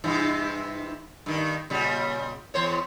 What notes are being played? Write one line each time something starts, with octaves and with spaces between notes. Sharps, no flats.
G2 C3 E3
G2 D#3
A#2 C#3 G3
E2 C5 C#5